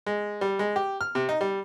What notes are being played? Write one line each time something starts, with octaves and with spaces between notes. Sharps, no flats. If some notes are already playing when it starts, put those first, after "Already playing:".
G#3
G3
G#3
G4
F6
C3
D#4
G3